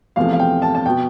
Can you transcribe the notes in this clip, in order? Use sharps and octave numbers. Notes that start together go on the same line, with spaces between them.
E2 C3 F3 A3 F5
F5
G5
A5
A5
B2 G5